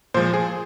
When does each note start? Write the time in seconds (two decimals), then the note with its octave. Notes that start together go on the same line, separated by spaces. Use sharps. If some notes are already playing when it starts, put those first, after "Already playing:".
0.14 A#2 F3 G#3 C5
0.34 G#4